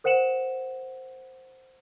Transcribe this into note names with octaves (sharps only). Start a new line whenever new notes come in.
A#4 C5 F#5 C#7 E7 F#7